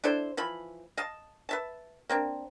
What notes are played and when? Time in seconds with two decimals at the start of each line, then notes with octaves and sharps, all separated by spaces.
0.04 D4 E4 A4 C5
0.37 E3 F3 B5
0.97 D#5 F5 A5
1.49 B4 E5 A5
2.09 A#3 C4 D4